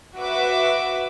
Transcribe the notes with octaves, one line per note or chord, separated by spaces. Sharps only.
F#4 B4 E5 D6